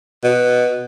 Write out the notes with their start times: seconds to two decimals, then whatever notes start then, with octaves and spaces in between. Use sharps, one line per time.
0.24 B2